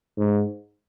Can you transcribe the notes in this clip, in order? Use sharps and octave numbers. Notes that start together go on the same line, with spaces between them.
G#2